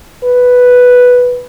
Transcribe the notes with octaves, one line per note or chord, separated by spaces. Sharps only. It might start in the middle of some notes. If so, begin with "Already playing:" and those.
B4